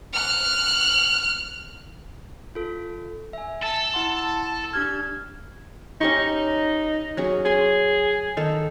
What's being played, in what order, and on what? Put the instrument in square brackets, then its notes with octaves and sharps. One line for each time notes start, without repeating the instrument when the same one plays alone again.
[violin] F6 F#6
[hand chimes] F4 A4
E5 G#5
[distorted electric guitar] A4 [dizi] A5
[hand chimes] E4 F#5 C6
[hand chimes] D4 G4 F6 [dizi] G#6
[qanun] C#4 G4 C#6 [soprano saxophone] D#4
[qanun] F#3 C#4 G#4
[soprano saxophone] G#4 [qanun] G#5 C6
[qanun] D#3 D#4 A4